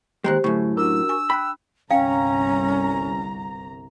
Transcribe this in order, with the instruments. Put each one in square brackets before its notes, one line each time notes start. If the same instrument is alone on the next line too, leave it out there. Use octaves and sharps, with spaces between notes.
[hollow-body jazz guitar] D#2 G#2 G#3 [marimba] G4 C5 [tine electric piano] G5 A#5 F#6
[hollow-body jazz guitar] F#2 A2 [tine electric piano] D3 A3 [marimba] C#6
[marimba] D4 [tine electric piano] F#4 A#4 [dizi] E6
[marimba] G#5 C#6
[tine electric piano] G5 F#6 [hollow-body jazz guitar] B5
[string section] G1 C2 A#5 [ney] C#4 [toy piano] F5 G5